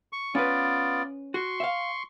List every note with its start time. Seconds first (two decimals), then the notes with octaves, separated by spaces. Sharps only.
0.13 C#6
0.35 B3 C#4 F4 B4 D5
1.34 F#4 C6 C#6
1.60 E5 F5